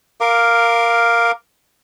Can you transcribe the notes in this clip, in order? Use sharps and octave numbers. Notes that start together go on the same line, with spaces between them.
A#4 F5 D6